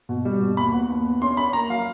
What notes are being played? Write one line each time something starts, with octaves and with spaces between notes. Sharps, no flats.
B2
G3
B2
D#2 B5
B3
D#2
B3
C#4 C6
C#4 B5
A#3 A#5
F#3 F5